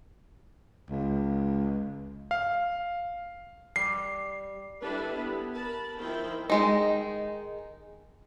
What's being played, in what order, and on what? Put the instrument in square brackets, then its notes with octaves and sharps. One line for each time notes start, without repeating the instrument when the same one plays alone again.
[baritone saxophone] C#2
[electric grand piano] F5
[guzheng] G3 [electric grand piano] C7
[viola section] G3 D4 E4 A4 B4
B3
A#4 A5 B5
D#3 F3 E4 C5 G5
[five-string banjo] D#3 G#3 D#4